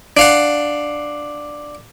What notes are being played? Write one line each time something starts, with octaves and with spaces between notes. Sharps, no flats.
D4 F5 F#5